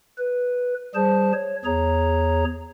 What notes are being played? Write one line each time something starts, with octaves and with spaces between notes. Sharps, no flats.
B4
G3 G#4 C5 A5
C#5
E2 G#4 C#5 A#5